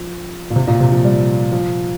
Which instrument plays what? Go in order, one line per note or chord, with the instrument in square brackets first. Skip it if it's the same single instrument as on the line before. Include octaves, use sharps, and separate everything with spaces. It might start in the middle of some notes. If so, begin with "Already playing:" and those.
Already playing: [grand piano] F3
A#2
C3
A#2
C3
F3
G3
F3